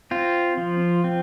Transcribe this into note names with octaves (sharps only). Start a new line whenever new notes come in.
C4 F4
F3
C4